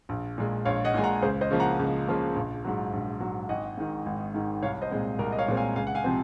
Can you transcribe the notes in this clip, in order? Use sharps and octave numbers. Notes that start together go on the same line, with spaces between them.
A#1
A#2 G#3
A#1 C#5 F5
D#5 F#5
A#2 G#3 G#5
F#5 A#5
C#2 G#4 C5
C5 D#5
C#3 F3 A#3
F#5 A#5
C#2
C#3 F3 A#3
A#1
G#2 F#3
A#1
G#2 F#3
G#1 D#5 F#5
G#2 D#3
G#1
G#2 D#3
C2 C#5 F5
C5 D#5
A#2 G#3 C4
C2 A#4
D#5
C#5 F5
A#2 G#3 C4
F5 G#5
C#2 F5 G#5
F#5
F5 G#5
C3 F3 C4